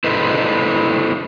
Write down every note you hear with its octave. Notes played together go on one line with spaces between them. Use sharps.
E4 A4 B4 C5 D#5